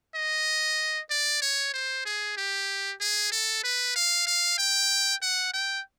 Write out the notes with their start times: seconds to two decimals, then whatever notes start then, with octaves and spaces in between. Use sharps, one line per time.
0.15 D#5
1.10 D5
1.42 C#5
1.74 C5
2.06 G#4
2.37 G4
3.01 G#4
3.32 A4
3.64 B4
3.96 F5
4.27 F5
4.58 G5
5.22 F#5
5.53 G5